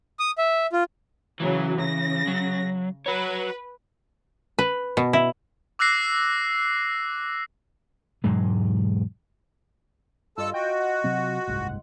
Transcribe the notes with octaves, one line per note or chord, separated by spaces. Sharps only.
D#6
E5
F4
C#3 E3 F#3
C#3 A#6
F#3
F#4 B4 C#5
B4
B2
E4
D6 E6 F#6 A#6 C7
E1 G#2 F#3 G#3
G2 F4 A4 D#5 A5 E6
F#4 G5
F#5
C3 F#3 C4
F#1 C2 G#2